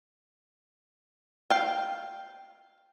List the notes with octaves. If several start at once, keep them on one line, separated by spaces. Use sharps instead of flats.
F5 G5